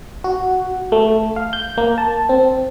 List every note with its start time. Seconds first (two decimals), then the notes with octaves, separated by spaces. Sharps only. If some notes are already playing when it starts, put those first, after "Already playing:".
0.24 F#4
0.92 A3
1.36 F5
1.53 G6
1.78 A#3
1.98 A5
2.29 C4